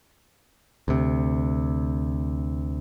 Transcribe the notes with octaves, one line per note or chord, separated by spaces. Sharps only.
D2 C3